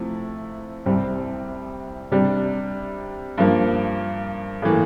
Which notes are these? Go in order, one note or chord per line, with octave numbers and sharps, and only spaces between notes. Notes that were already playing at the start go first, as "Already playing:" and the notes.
Already playing: C3 F3 A3 E4
C2 C3 G3 C4
C3 G3 D4
G2 F3 A#3
A2 E3 A#3